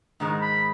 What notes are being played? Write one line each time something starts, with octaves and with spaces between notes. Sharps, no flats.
G#2 D#3 G#3
B5